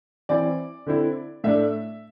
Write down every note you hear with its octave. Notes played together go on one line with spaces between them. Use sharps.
E3 C4 E4 D5
D3 C4 E4
A2 A3 D4 E5